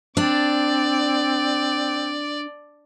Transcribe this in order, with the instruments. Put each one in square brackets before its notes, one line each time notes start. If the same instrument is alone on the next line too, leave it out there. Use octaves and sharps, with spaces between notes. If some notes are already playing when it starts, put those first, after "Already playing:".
[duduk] C4 [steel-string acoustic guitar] D4 [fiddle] D5